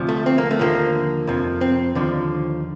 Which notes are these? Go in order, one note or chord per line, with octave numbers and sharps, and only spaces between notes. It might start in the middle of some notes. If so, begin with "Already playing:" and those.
Already playing: D2 C3 F3
A3
C4
A#3
A3
D#2 D3 F3 A#3
F2 C3 F3
C4
D#2 D3 F3